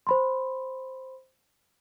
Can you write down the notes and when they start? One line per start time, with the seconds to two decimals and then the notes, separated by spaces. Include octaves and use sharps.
0.07 C5 B5 C6